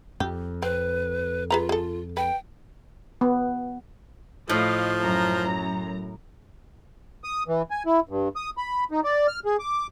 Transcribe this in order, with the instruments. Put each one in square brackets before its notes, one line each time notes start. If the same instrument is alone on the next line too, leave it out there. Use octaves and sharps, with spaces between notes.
[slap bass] F2 [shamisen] G4
[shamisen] C4 [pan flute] B4
[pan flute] F4 [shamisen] G#4 B4 A#5
[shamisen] G#4 A4
[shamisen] B4 [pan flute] G5
[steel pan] B3
[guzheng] A2 [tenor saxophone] F3 [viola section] A3 D#5 F5
[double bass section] F#2 [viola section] A#5
[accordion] D#6
E3
G#5
E4
G2
D#6
B5
D#4
D5
F6
G#4
D6